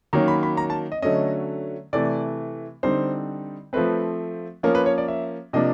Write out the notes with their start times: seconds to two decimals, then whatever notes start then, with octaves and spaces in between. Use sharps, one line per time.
0.13 D#3 F#3 A#3 C#4 A#5
0.28 B5
0.43 B5
0.57 A#5
0.70 A5
0.92 D#5
1.02 D3 F#3 A3 C#4 D#5
1.93 C3 E3 A3 D5
2.83 D3 G3 C4 D#4 C5
3.73 F3 A3 C4 B4
4.63 F3 A#3 C#4 A#4
4.75 B4
4.86 C#5
4.98 D5
5.08 E5
5.53 C3 F3 A#3 D4 D#5